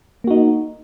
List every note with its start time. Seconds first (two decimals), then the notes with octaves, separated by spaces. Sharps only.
0.24 A#3
0.27 F#4
0.31 D#4